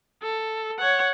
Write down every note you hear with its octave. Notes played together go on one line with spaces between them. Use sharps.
A4
C#5 F#5